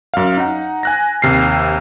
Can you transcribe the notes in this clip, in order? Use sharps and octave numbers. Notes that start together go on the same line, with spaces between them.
F#2 F5
D#4 F#5
G#5 F#6 A#6
D#2 C3 F6 C7